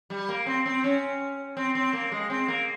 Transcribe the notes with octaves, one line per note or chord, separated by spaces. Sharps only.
G3
A#3
C4
C4
C#4
C4
C4
A#3
G#3
C4
A#3